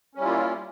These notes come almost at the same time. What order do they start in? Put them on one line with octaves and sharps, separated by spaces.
C#4 G3 E4 F4 A#3